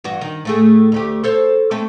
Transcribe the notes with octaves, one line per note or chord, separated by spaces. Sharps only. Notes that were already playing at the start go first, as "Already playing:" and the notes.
G2 E3 F#4
D#3
A2 A3 G#4
D2 A3 G4
A4 C5 C#5
A3 C4 C#4